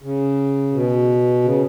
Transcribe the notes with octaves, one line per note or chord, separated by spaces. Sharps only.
C#3
B2
C#3